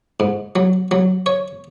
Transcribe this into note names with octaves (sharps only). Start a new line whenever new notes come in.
G#2
F#3
F#3
C#5